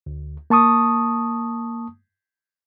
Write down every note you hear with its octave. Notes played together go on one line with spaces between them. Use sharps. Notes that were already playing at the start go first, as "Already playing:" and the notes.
D2
A#3 A5 C#6 D#6